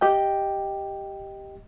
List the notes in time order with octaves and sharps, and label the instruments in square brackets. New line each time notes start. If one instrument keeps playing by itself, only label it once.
[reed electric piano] G4 D#5 G5